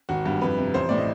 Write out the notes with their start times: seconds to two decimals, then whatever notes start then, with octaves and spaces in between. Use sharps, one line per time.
0.09 G#1 F#4
0.25 G2
0.41 F2 B4
0.58 C3
0.74 A1 C5
0.89 A2 D5
0.98 D#5